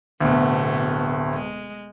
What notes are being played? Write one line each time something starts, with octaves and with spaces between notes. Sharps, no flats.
D1 D2 B2 A3 B3
G#3